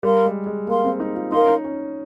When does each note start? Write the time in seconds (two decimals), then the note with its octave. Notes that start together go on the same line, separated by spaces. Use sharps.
0.03 G3 A#4 F5 C6
0.25 G#3
0.46 G#3
0.67 A#3 A#4 F5 C6
0.84 C4
1.00 D#4
1.16 F4
1.32 D#4 A#4 F5 C6
1.41 C#4
1.48 D#4
1.64 C#4